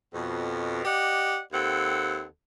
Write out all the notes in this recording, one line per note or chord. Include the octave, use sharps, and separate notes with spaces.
F2 B2
G4 D5 D#5 F#5
D#2 C4 A4 F#5